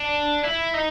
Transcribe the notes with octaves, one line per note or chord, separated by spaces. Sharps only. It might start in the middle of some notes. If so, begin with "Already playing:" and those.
Already playing: D4
E4
D#4